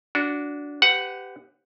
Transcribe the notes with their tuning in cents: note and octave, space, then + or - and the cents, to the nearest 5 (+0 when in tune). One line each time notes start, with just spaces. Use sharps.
D4 -15 F#4 -5
G4 +0 B4 +35 F#5 +0